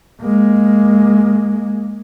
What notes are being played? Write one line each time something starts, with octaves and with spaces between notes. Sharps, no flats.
G#3 A#3